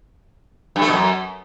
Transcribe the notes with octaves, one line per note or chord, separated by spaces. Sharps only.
G2
A3
B2
F#2